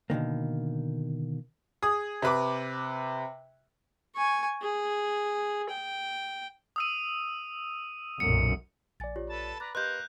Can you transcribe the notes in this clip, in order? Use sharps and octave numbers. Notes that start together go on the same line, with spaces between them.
B2 D3 D#3 A#3
G#4 D#6
C3 B4 D6
G#5 C#6
G#4
G5
D#6 E6 D#7
B1 F#2 A#2 C#7
A#1 D5 G#5 A6
F4 G4 C#5
A4 B4 A5
B4 D5 A#5 F#6 A6
A#3 G4 B4 D#5 C6 F#6 G6